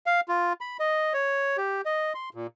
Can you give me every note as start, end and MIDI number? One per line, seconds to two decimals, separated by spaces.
0.06 0.20 77
0.28 0.53 65
0.61 0.77 83
0.80 1.13 75
1.14 1.57 73
1.57 1.81 67
1.85 2.13 75
2.14 2.29 84
2.34 2.47 46